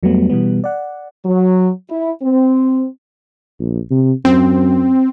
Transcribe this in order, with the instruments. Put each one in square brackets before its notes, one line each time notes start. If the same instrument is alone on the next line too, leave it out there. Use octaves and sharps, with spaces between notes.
[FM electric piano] F2 F#3 G3 A3 B3
B2 E3 G3 B3
D5 F#5
[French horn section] F#3
E4
C4
[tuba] A#1
C3
[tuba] F#2 [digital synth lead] C4